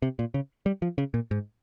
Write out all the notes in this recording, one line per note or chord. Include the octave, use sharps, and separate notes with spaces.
C3
A#2
C#3
G3
F3
C#3
A#2
G#2